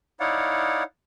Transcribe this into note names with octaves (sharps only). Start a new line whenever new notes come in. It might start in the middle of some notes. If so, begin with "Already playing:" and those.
D#4 E4 C#5 D5 F5 F#5